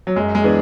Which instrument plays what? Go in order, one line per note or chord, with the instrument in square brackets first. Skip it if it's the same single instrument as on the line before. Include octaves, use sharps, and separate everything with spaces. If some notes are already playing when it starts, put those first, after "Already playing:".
[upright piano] F#3
[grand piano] F#2 [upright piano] G#3
[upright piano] G#3
[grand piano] E3 B3 D4 G#4